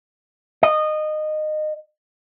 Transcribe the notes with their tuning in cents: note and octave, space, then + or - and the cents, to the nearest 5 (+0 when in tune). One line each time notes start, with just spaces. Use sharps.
D#5 -20